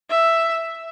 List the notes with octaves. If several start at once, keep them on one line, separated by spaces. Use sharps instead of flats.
E5